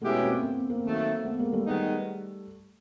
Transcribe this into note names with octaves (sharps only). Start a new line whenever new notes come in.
B2 G#3 A3 B3 C#4 E4 G4
A#3 C4
C4
B3
A#3 C4
D#3 F#3 A3
A3 B3
G#3 A#3
G3 A3
D#3 G#3 B3 D#4